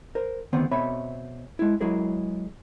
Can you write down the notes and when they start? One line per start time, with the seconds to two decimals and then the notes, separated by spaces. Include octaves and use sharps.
0.15 A#4 C5
0.53 D2 D#3 B3 C4 F#5
0.71 B2 C4 C#5 E5 B5
1.59 G#3 E4
1.80 F#3 G#3 E4 G#4 A#4